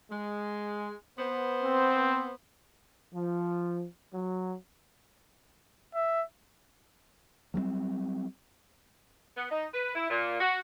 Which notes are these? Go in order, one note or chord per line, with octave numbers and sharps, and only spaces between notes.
G#3
B3 C5
C4
F3
F#3
E5
F#3 G3 A#3 C4
B3
D#4
B4
E4
A#2
F#4